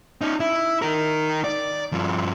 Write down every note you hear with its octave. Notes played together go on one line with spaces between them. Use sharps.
C#4 D#4
E4
D#4 A#4
D5
G2 F3